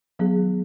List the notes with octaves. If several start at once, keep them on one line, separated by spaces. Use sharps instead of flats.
D#3 F#3 B3 D#4 G#4